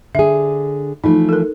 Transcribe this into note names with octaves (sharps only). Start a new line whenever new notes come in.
D3 G#4 E5
E3 F3 A3 D#4
A4 A#4